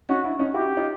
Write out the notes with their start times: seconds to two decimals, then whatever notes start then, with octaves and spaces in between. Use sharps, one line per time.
0.09 C#4 D#4 F#4
0.24 D4 E4
0.39 C#4 D#4
0.54 E4 F#4 G4
0.77 D#4 F4